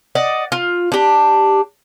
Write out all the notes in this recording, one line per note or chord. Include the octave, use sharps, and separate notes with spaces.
D5 D#5 F#5
F4
D4 G4